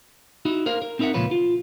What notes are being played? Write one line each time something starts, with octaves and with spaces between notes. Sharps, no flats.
D#4 E4 F#4
A#4 C5 F5
A#4
C4 D#4 E4 A#4 E5 F#5
C#2 A#2 F3 F4 B4 C#5
F4